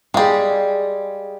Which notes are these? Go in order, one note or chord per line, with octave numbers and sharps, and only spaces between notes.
G3 G#3 G#4 F5